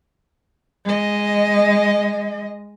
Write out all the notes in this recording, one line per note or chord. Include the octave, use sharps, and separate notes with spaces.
G#3 D#5